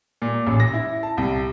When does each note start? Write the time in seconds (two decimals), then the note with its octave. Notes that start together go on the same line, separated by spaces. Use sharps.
0.22 A#2
0.47 A1
0.60 A#6
0.74 E4
1.03 A5
1.17 C2